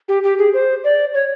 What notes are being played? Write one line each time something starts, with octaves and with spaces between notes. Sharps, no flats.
G4
G4
G#4
C5
D5
C#5